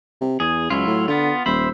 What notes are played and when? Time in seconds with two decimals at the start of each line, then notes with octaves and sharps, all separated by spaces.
0.21 C3
0.40 E2 G#4
0.70 C#2 F#3 E4 F4
0.87 A2
1.08 D3 B3 F4
1.46 D#1 C5 E5 B5